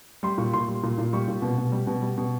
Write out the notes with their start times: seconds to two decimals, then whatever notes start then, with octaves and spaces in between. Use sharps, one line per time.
0.23 G3 C6
0.38 A#2 C#6
0.53 A#2 C6
0.68 G3
0.83 A#2
0.98 A#2
1.13 G3 C#6
1.28 A#2
1.42 B2
1.58 B2
1.72 G3
1.87 B2
2.02 G3
2.18 B2